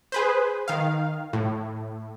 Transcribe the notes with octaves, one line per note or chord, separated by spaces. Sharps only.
G#4 B4 C5
D#3 F5
A2